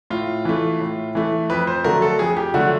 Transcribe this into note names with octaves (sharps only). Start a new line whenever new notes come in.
A2 F4
E3 A3
A2
E3 A3
F2 B4
C5
D3 F#3 A3 A#4
A4
F2 G#4
G4
D3 F#3 A3 F#4